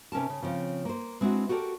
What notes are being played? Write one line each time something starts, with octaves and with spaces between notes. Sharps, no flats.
C3 C#4 A#4 A5
C#3
C#3 F3 C4 C#5
A#3 C5
G#3 C4 D4 E4 F#4
F#4 G4 A4 A#4 D5